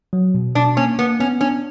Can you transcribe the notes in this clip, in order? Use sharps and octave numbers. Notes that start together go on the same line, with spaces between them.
F#3
B2
B2 D4
A#3 C#4
A#3 B3
B3 C#4
C#4 D4